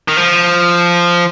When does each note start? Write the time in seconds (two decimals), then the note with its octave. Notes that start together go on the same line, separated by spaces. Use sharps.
0.08 D#3
0.17 F3